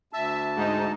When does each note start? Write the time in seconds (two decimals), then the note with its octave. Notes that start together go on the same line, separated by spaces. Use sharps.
0.13 D2 E5 A5
0.56 G#2 D#4